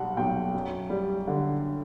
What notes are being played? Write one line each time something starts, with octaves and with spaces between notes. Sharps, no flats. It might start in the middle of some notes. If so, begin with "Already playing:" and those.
Already playing: B1 G3 F#5
B1 G5
F#2
G3
D3